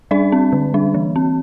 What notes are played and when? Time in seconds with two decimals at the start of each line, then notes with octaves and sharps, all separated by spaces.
0.11 G3 D4 D5
0.32 C4
0.53 D3
0.74 G3 D4
0.95 E3
1.16 C4